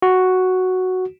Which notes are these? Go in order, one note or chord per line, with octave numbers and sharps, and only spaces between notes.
F#4